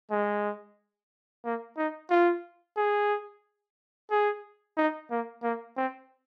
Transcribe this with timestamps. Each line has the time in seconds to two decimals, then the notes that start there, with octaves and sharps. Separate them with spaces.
0.11 G#3
1.44 A#3
1.77 D#4
2.10 F4
2.77 G#4
4.11 G#4
4.77 D#4
5.10 A#3
5.43 A#3
5.77 C4